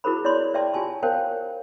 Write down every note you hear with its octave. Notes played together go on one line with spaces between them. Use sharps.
E4 F#4 G#4 A#4 C5 B5
E4 C#5 D5 B5 C6
B4 D5 E5 G5 A5 C6
F4 G4 G#5 A5 C6
A#4 C5 C#5 F5 G5 A5